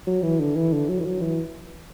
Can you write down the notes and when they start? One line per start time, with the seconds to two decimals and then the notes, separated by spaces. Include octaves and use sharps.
0.07 F#3
0.22 E3
0.39 D3
0.55 E3
0.72 D3
0.89 F#3
0.99 E3
1.04 F#3
1.21 E3